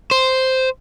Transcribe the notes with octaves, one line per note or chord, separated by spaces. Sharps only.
C5